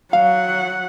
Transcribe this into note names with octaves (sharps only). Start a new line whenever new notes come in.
F#3 F5 F#5